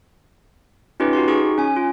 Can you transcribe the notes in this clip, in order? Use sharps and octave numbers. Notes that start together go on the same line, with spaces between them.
C#4 D#4 F4 G4 B4
F#4 G4 C6
D#4 G#4 C#6
C#4 G#5
F4